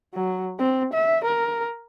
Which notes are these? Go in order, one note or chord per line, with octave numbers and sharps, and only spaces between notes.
F#3
C4
E5
A#4